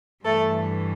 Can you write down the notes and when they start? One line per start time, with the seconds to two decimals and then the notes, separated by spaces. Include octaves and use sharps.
0.24 G2 E3 A3 A4